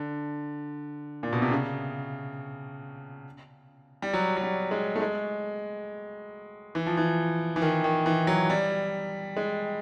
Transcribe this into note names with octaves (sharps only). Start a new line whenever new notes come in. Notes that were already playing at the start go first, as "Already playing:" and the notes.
Already playing: D3
A#2
B2
C3
C#3
G3
F#3
F#3
G3
G#3
A3
G#3
E3
F3
E3
E3
D#3
D#3
E3
F#3
G3
G#3